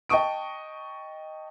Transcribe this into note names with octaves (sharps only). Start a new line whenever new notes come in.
D#5 G5 A5 C#6 D#6 D7